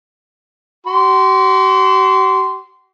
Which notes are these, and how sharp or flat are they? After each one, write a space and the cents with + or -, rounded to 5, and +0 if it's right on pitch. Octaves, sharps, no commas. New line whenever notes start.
F#4 +45 C6 -15